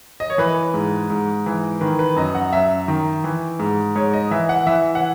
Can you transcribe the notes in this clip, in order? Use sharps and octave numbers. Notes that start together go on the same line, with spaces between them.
D#5
C#5
E3 B4
G#2
G#2
E3
D#3 B4
B4
F#2 D#5
F#5
F#2 E5
D#3
E3
G#2
G#2 C#5
D#5
E3 E5
F#5
E3 E5
F#5